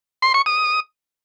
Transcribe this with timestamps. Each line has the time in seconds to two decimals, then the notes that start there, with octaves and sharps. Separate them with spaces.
0.22 C6
0.34 C#6
0.46 D#6